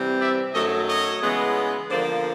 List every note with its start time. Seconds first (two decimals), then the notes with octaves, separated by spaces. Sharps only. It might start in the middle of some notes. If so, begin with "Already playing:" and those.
Already playing: C3 E3 G3 C4
0.21 D5 E5
0.54 F#2 D#3 F#3 A3 C#5 D#5
0.88 C#5 D#5
1.22 C#3 E3 G#3 B3
1.90 D3 F3 A#3 C5 D5